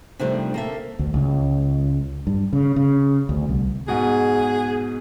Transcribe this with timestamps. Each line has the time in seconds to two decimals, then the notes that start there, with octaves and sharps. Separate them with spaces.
0.19 C3 D#3 F3 G3 A3 D4
0.54 A#3 A4 E5
0.99 D2
1.14 C#2
2.27 G2
2.53 C#3
2.76 C#3
3.29 D2
3.49 C2
3.88 G#2 B2 G#4